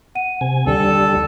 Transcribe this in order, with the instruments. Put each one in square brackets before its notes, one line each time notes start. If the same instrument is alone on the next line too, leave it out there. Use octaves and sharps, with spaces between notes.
[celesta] F#5 D#7
[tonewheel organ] C3 G#5
[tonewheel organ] D#2 D3 G3 [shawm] A4